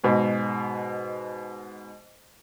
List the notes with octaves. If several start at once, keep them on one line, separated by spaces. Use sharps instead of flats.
G#2 B2